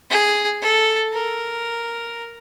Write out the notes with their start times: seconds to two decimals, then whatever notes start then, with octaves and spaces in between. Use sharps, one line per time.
0.10 G#4
0.62 A4
1.13 A#4